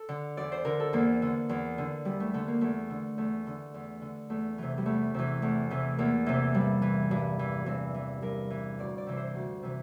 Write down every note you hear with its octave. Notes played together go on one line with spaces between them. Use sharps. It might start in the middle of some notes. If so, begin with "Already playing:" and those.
Already playing: A4
D3
E2 D5
C5
D3 A#4
A4
E2 A#3
D3
E2
D3
E2 G3
A3
D3 A3
A#3
E2 A3
D3
E2 A3
D3
E2
D3
E2 A3
C3 E3
G3
E2 A3
C3 E3
E2 A3
C3 E3
E2 A#3
C3 E3
G2 G3
E3
G2
E3
G2 C4
E3
G2 A#4
E3
D2 D5
D5
C3 E3
C5
D2
C3 E3